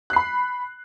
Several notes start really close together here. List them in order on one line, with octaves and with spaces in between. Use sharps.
F#6 C7 B5